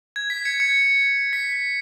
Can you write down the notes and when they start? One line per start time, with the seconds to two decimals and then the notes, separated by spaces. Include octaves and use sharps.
0.16 G#6
0.30 B6
0.45 G#6 C#7
0.60 G#6 C#7
1.33 B6
1.53 B6